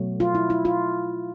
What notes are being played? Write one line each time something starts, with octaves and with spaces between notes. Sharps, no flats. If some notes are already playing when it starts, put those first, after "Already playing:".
Already playing: B2 F#3 A3
F4
E4
E4
F4